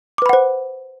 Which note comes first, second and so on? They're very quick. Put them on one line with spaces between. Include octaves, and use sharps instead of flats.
D6 B4 B5 F#5 C5